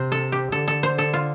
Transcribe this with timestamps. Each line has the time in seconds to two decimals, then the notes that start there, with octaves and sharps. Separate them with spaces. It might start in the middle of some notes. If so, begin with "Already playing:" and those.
Already playing: C3 C5
0.12 A4
0.32 G4
0.52 D3 A4
0.68 A4
0.83 C5
0.98 A4
1.14 F4